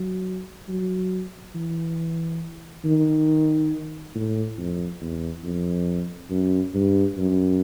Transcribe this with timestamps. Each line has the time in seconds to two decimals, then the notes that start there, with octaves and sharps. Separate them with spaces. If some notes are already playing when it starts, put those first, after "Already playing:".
Already playing: F#3
0.69 F#3
1.55 E3
2.85 D#3
4.15 A2
4.58 F2
5.01 E2
5.44 F2
6.30 F#2
6.74 G2
7.18 F#2